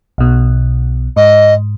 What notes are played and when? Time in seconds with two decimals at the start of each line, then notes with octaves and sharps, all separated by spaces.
0.18 B1 B2
1.17 G#2 D#5